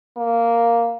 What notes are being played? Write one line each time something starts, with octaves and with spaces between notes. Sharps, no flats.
A#3